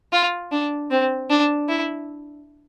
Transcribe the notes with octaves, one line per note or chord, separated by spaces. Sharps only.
F4
D4
C4
D4
E4